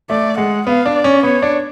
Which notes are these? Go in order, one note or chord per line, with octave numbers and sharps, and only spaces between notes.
A3 D5
G#3 F#5
B3 F5
D4
D5
C#4
B3 C#5
D4